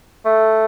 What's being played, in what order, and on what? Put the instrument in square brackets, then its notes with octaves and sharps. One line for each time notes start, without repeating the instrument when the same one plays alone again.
[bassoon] A3